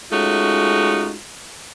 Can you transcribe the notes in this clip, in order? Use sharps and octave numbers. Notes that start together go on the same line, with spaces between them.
G#3 A3 C#4 D#4 F4 F#4